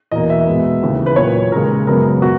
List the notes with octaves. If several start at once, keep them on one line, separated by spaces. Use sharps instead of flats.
E2 B2 A#3 D#5
E5
B2 G#3 B3
D#2 C#3 E3 A#3
B4
A#2 F#3 A#3 C#5
D#2 C#3 G#3 A#4
F#2 C#3 G#3 B3 A#4
B2 F#4